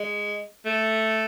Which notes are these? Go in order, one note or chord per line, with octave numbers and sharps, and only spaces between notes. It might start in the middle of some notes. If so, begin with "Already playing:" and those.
Already playing: G#3
A3